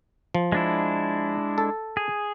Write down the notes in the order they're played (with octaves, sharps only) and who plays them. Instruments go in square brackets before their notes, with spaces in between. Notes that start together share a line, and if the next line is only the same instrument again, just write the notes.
[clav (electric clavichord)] F3
[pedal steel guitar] G#3 D4 E4
[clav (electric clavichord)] A4
[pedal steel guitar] G#4